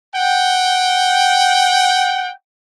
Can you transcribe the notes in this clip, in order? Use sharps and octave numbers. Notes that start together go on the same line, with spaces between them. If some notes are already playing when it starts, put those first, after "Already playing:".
F#5 G5